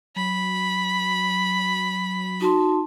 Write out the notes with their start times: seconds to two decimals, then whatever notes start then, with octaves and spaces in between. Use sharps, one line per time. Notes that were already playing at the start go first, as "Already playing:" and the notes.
0.16 F#3 B5
2.41 D#4 F#4 A5 C6